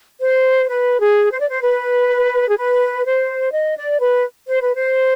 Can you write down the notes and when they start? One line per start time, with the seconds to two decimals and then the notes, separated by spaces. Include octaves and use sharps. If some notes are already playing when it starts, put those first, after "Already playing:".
0.20 C5
0.68 B4
0.99 G#4
1.31 C5
1.40 D5
1.49 C5
1.62 B4
2.48 G#4
2.57 B4
3.05 C5
3.53 D#5
3.76 D5
3.99 B4
4.47 C5
4.61 B4
4.75 C5